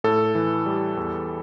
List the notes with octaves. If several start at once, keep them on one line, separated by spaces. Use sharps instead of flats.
A2 A4
E3
G3
E2